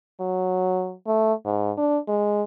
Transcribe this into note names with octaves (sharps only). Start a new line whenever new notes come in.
F#3
A3
G#2
D4
G#3